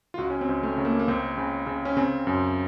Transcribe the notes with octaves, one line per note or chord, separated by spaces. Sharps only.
F4
C#2 F#4
C#4
C4
C#2
A3
C#3
A#3
A#3
C#2 C4
C#3
C#3
C#4
C#3 C4
F#2